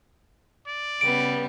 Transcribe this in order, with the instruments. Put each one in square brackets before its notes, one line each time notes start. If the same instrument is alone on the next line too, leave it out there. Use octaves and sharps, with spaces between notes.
[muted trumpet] D5
[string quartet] C#3 G3 B3 [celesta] D7